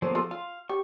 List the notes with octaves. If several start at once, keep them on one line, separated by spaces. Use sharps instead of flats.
F3 A#3 B3 C#4 A4 C5
F4 A4
F4 F5
G4 C#6